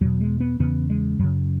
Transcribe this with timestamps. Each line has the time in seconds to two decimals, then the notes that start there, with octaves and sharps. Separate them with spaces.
0.01 E2 B2 F#3
0.21 G#3
0.40 B3
0.60 E2 C#3 B3
0.90 G#3
1.19 F#2 C#3 F#3